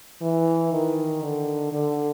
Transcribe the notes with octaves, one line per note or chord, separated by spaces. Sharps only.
E3
D#3
D3
D3